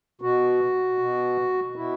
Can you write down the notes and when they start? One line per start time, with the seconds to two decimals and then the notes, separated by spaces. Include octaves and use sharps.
0.21 B2 F#4
0.98 B2
1.76 B2 E4